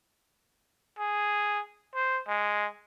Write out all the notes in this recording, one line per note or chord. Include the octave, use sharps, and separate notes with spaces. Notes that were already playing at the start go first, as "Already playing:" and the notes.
G#4
C5
G#3